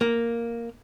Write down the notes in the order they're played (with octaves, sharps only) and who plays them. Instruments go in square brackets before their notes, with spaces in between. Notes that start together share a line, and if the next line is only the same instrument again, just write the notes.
[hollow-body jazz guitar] A#3